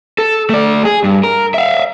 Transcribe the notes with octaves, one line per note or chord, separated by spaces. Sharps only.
A4
A3 D5
G#4
G2
A#4
E5 F5